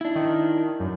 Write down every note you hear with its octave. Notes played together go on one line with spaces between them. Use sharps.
D4 E4
D#3
F#2